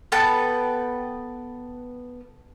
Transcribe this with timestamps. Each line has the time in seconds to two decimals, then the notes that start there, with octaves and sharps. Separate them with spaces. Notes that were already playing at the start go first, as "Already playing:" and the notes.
0.12 B3 A4 B4 G5